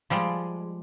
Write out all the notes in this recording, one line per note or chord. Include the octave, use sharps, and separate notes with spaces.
F3 G3 G#3